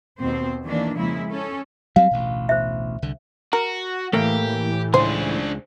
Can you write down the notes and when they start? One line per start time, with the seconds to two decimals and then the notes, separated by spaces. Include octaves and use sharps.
0.20 D#2 B2 C4 C5
0.65 D#3 E3 A#3 D4
0.95 F2 C#3 F3 G#3 A#3 E4
1.29 C#4 A4
1.96 F#3 G3 C4 F5
2.11 A1 D2 B2
2.49 C5 E5
3.02 C2 D3
3.53 F#4 A#4
4.13 A2 E3 A3 A#3 G4
4.94 C#2 D4 G#4 C5